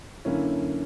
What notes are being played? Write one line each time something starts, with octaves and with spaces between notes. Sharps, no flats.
F#2 D3 A#3 C#4 E4